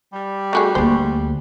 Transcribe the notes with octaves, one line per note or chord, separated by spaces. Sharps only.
G3
A3 F#4 G#4
D2 A#3 C5